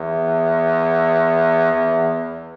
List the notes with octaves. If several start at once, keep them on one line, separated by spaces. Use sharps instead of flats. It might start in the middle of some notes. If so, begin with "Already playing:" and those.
Already playing: E2
E2